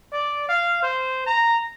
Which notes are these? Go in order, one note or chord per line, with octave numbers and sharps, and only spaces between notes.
D5
F5
C5
A#5